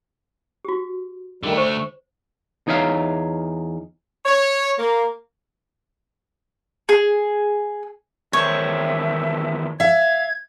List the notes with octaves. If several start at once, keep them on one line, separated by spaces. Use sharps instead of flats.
F#4 G4
D3 D#3 G3 A3
C5 C#6
E2 D#4 C#5 E5 F5
C#5
A#3
G#4
E2 D#3 C5 C#5 E5
E5 F5 G#6